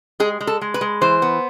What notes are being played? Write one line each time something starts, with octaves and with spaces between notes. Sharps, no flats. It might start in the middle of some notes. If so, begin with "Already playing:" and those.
G#3 G#4
G#3
A4
G#3
B4
G#3
E3 C5
B3